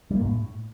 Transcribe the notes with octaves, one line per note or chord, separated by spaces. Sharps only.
G3
A#3
G#2
A2